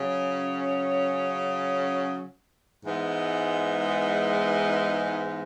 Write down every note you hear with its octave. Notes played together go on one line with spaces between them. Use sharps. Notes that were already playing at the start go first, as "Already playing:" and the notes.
Already playing: C#3 F#3 C#4
G#2 E3 G#3 B3